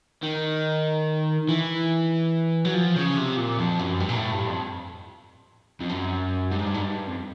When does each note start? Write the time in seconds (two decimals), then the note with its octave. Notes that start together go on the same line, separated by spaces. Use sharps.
0.23 D#3
1.49 E3
2.65 F#3
2.74 F3
2.96 C#3
3.17 C3
3.37 A#2
3.59 F2
3.79 F#2
4.00 G2
4.09 A#2
4.16 A2
4.32 G2
4.47 F2
5.80 F2
5.89 F#2
6.51 G2
6.59 G#2
6.67 G2
6.74 G#2
6.81 G2
7.07 F2